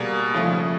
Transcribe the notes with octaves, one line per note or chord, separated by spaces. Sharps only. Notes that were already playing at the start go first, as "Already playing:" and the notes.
Already playing: B2 G3 A#3 G#4
C#3 F3 A3